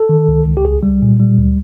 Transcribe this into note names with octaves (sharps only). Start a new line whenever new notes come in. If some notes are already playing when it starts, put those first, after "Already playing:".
Already playing: A4
D#3
C#2
C#2
G4
C2 G#4
G3
A#2
G3
D2